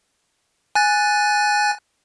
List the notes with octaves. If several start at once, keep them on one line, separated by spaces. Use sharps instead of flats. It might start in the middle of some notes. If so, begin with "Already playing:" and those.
G#5 F#6 A6